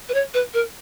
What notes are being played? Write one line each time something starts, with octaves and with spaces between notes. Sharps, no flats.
B4
C#5
B4
A#4